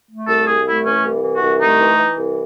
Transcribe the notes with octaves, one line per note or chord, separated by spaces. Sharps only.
A3
C2 A4
C2 G#4
A3 E4
E3 C#4
C2
E3
F#4
C2
A3 D#4
E3
E3
C2